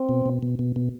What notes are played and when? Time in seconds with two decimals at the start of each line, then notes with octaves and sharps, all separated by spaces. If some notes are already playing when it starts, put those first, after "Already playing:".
Already playing: C4
0.09 B2
0.26 B2
0.43 B2
0.59 B2
0.76 B2